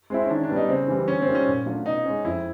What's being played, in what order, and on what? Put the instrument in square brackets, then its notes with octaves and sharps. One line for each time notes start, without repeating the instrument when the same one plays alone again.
[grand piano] G#3 C4 E4
[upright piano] C#4
[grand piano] D#3 [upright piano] D4
[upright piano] D4
[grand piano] G3 B3
[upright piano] D#4
[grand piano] C#3 [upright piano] C4
[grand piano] E3 G3
[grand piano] D3 [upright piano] C#4
[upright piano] C4
[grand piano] G3 A#3 D#4
[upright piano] C#4
[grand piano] A#2
F#3 A3 D4 F4
[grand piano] B2 [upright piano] D#4
[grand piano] G#3 C#4
[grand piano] F2 [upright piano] E4